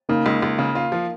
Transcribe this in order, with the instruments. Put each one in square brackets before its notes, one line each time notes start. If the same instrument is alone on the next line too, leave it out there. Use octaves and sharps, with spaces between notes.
[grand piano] C#3 [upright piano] A#3 D#4
[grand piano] C#2
C#2
C#3
F4
F3